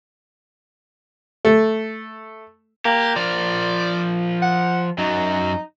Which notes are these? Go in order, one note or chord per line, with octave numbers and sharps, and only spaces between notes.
A3
A#3 G4
F3 A#4 D5
F#5
F#2 F#3 D#4